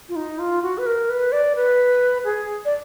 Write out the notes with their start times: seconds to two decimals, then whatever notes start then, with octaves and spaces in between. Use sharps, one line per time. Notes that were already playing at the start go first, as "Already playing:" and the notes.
0.09 F4
0.16 D#4
0.39 F4
0.62 F#4
0.78 B4
0.86 A#4
1.09 B4
1.32 D5
1.56 B4
2.25 G#4
2.65 D5